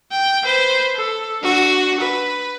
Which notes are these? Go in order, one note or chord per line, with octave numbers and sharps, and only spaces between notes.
G5
B4 C5
A4
D4 F#4
B4